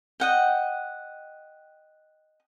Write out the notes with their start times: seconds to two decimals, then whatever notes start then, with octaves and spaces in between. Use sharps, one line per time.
0.20 D#5 F#5 G5